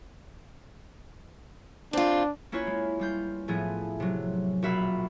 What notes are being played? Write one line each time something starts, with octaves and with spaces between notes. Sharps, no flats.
C4 D4 F4
A#3 C#4 E4 F4 B4 C#5
G#3
G3 F4 G6
A2 F3 A3 B3 G#4
C3 F#3
A#1 B2 F#4 E5 F5 B5